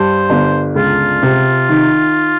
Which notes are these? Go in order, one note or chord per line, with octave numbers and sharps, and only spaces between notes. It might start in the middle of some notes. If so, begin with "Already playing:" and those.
Already playing: G2 G3 C5
G1
C#2 F4
C3
D#3